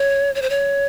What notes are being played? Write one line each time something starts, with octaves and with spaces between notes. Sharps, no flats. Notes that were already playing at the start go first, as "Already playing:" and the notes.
Already playing: C#5
C#5
C5
C#5